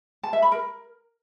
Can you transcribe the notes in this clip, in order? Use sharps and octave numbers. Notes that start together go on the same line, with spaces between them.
A5
E5
B5
A#4